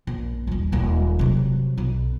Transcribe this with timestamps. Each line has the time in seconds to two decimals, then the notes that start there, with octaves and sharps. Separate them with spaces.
0.07 A#1
0.47 D#1 F2
0.72 D#1 A#3
1.19 C3 F#3
1.78 B1